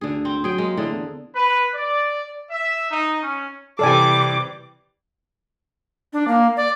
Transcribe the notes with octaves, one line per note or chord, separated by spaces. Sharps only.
D2 D3 G#4
C4
F#3 G#4 G5
G#3 A#3
A2 D3 G#4
E2
B4
D5
E5
D#4
C#4
C3 E3 G3 A4 D5 G#5 D6
D4
A#3
D5